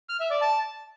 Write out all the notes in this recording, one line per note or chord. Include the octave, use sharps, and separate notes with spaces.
F6
E5
D5
A5